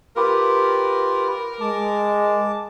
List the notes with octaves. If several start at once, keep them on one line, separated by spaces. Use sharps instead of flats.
F4 G4 A#4 B4
G#3 A5 D6